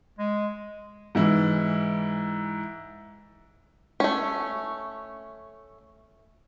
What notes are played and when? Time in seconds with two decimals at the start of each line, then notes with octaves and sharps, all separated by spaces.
0.19 G#3
1.15 G#2 E3 E4
4.00 A3 C#4